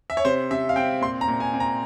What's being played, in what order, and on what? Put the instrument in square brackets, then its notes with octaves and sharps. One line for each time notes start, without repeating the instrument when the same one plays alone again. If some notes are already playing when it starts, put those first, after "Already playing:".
[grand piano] E5
C#5
C3 C5
C3 E5
F5
C4 G5
A#2 C6
A#5
A#2
G#5
C4
A#5